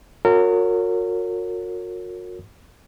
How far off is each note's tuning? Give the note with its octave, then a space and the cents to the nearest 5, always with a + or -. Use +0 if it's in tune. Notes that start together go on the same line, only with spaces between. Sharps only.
F#4 -35 A#4 -30 C#5 +0